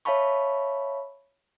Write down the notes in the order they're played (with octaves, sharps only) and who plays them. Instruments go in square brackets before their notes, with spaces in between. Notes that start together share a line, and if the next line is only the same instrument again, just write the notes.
[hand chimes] C#5 E5 F5 A5 B5 C#6